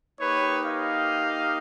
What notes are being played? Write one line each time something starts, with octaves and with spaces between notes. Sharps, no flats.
A#3 D#4 G4 B4 C#5
D#5 F5